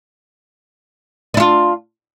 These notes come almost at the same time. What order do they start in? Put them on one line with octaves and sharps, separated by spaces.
D4 E4 F4